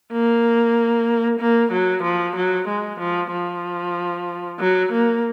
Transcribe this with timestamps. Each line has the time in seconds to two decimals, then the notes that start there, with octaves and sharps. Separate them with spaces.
0.12 A#3
1.40 A#3
1.72 F#3
2.03 F3
2.36 F#3
2.68 G#3
3.00 F3
3.32 F3
4.60 F#3
4.92 A#3